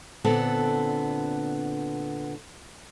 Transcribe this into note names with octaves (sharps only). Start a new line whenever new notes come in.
A#2 D3 B3 C4 A4